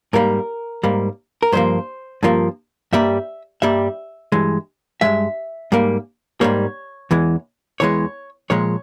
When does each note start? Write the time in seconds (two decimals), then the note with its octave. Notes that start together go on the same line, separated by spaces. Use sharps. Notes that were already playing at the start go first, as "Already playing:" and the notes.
0.13 G#2 G3 A#3 A#4
0.84 G#2 G3 A#3
1.43 A#4
1.52 G2 F3 A#3 C5
2.23 G2 F3 A#3
2.93 G2 G3 A#3 E5
3.62 G2 G3 A#3 E5
4.32 G2 E3 G#3
5.01 G2 E3 G#3 E5
5.72 G#2 G3 A#3
6.41 G#2 G3 A#3 C#5
7.11 E2 E3 G#3
7.80 E2 E3 G#3 C#5
8.50 A#2 F3 G#3 C#5